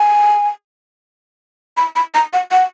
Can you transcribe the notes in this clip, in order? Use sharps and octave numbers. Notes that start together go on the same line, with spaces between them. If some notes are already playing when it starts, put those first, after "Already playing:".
Already playing: G#5
B5
B5
A#5
F#5
F#5